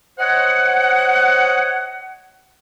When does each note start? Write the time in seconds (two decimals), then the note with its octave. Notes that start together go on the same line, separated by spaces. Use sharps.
0.19 C5 C#5 D#5 F#5